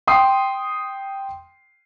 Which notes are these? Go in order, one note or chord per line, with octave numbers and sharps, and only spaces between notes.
G5 C6 D#6 C7